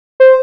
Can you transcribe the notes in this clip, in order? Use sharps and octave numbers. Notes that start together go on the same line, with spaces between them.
C5